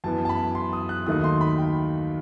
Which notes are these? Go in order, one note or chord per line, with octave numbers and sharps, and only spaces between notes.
F#2 E3 B3 A5
A5
B5
C6
D#6
F#6
D#2 D#3 F#3 A3 D#4 D#6
C6
B5
G5